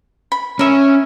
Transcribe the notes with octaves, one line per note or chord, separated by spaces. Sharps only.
B5
C#4 A#4 E5